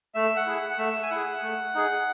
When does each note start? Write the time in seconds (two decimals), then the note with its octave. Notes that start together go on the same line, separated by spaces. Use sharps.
0.15 A3 E5
0.36 F#5
0.46 E4 G#4
0.57 F#5
0.70 F#5
0.78 A3 E5
1.03 G#5
1.10 E4 G#4 F#5
1.42 A3
1.75 D#4 G#4